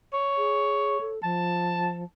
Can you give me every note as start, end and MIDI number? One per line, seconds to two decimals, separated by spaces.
0.13 1.09 73
0.37 0.98 68
1.01 1.22 69
1.23 2.04 53
1.23 2.00 81